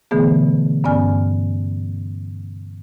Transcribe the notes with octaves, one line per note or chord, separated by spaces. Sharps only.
B2 D3 E3 A3 B3 G#4
G2 B3 C#4 D5 G#5 F6